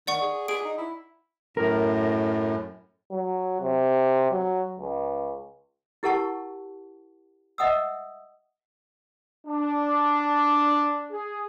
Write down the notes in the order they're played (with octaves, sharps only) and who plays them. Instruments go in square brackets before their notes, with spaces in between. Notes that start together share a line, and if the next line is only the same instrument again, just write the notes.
[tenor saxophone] D#3 [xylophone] D5 F#5 C#6
[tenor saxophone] G#4
[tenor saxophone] G#4 [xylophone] D7
[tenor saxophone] D#4
E4
[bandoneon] F#2 A2 [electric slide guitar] A#4
[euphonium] F#3
C3
F#3
C#2
[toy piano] E4 G4 A#4 F#5 A5 C#6
D#5 E5 F#5 D#6 E6
[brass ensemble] D4
G#4